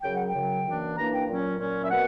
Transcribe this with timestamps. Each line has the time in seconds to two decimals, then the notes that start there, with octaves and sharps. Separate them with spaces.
0.02 F#2 C#3 F#3 G5
0.14 F#5
0.26 G5
0.33 F#2 C#3 F#3
0.65 F#2 E3 A#3 D4
0.96 F#2 E3 A#3 D4 A#5
1.12 G5
1.28 A#2 F#3 C#4
1.59 A#2 F#3 C#4
1.84 E5
1.90 B2 A#3 F#5